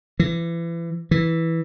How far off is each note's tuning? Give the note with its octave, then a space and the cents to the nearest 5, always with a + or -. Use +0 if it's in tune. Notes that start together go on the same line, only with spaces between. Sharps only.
E3 +30
E3 -5